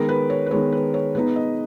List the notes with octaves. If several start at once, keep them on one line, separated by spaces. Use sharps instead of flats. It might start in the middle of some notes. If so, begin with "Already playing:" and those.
Already playing: D#3 G#3 B3 A#4
B4
C#5
B4
D#3 G#3 B3 C#5
B4
C#5
B2 G#3 B3 D#4 B4
D#5